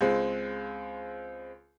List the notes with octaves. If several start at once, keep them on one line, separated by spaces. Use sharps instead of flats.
C#2 G#3 C4